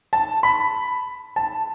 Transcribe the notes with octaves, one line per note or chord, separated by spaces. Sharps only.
A5
B5
A5